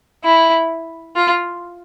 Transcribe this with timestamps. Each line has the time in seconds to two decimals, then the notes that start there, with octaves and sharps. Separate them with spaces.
0.24 E4
1.16 F4